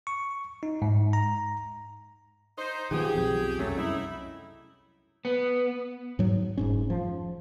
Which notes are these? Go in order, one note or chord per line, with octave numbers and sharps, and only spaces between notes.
C#6
D#4
G#2
A#5
D#4 C5
D#3 F3 B3 G4 G#4
B1 F2
C2 F#2 F#3 A3 C#4
D#4 E4
B3
G#2 F#3
F1 G#2 C#4
F3